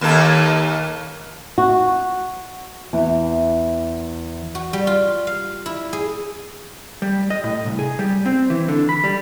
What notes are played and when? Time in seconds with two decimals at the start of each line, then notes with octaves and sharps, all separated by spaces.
0.01 D#2 A#3 A4
1.58 F#4
2.93 E2
4.55 F#4
4.73 G3
4.87 F4
5.27 F5
5.66 E4
5.93 G#4
7.02 G3
7.30 D#5
7.44 A2
7.66 C2
7.79 G#4
7.99 G3
8.26 C4
8.50 E3
8.68 D3
8.89 B5
9.04 G3